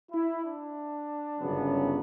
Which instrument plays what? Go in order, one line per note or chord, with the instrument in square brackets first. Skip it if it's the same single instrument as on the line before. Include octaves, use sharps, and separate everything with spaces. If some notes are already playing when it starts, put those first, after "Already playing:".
[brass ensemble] E4
D4
G1 F#2 C#3 F#3 B3